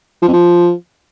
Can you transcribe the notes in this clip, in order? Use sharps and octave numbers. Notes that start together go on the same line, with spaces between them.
F3
F2
F3